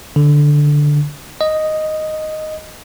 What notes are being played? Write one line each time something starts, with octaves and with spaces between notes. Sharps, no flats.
D3
D#5